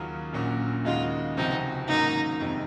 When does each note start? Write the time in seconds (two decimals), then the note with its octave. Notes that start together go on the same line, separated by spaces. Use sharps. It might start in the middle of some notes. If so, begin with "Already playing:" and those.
Already playing: D#2 C#3 F#3 C#4 F4
0.33 A#1 A#2 F#3 C#4 F#4
0.85 D#2 C#3 G#3 D#4 F4 F#4
1.37 C#2 C3 F3 C4 D#4 F#4
1.88 G#1 G#2 F#3 A#3 C#4 D#4
2.41 F2 C3 D#3 G#3 C4